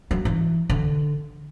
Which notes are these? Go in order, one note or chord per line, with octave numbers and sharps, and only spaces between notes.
F#3
E3
D3